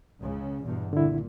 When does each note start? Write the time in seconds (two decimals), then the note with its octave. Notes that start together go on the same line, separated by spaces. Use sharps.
0.20 C#2 C#3
0.63 E2 G2 B2
0.93 C2 A#2 D3 E4